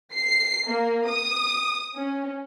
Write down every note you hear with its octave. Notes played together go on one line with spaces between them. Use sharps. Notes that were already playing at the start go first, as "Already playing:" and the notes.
C7
A#3
D#6
C#4